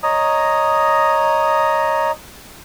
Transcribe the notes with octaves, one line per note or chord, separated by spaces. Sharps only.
C#5 D#5 A#5 D#6